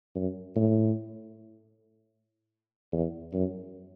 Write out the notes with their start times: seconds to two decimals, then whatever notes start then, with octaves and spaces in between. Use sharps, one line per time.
0.16 F#2
0.56 A2
2.93 E2
3.33 F#2